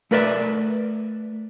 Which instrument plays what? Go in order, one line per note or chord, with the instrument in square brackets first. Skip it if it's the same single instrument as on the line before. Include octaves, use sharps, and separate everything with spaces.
[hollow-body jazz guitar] A3 A#4 B4 D5 E5